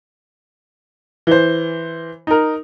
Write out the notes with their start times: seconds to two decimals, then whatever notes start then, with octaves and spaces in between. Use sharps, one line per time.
1.27 E3 C5
2.27 D#4 A#4